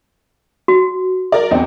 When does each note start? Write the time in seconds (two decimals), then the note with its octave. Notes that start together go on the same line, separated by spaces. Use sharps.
0.68 F#4
1.32 A#4 D5
1.51 E2 C4 D#5